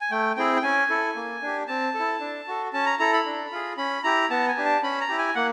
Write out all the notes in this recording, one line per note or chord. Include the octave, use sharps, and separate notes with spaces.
G#5
A3 G5
C4 E4 G#4 G5
G5
C#4 G#5
E4 A4
A#3
D4 G4
C4 A5
E4 A4
D4
F#4 A4
C#4 A5
A#5
E4 A4 A#5
B5
D4
F4 G#4
C#4 B5
E4 G4 A#5
B3 A5
G#5
D4 G4
A5
C#4 B5
A#5
E4 G4
G#5
A#3 F#5